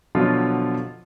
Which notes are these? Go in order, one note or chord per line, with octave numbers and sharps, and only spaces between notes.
B2 D3 F3 F#3 F4